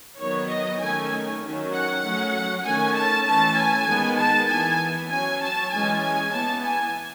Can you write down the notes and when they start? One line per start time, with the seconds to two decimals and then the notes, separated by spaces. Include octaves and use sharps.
0.19 D#3 F#3 B3 C#5
0.49 D#5
0.80 D#3 A3 C#4 G#5
1.42 D#3 F#3 C#4
1.72 F#5
2.03 F#3 A3 C#4
2.64 D#3 A3 C#4 G#5
2.95 A5
3.26 E3 A3 C#4 A5
3.57 G#5
3.87 D#3 G#3 B3
4.18 A5
4.49 E3 B3 G#5
5.10 F#3 C#4 G#5
5.42 A5
5.72 E3 G#3 C#4 G#5
6.02 G#5
6.33 E3 B3 A5
6.64 G#5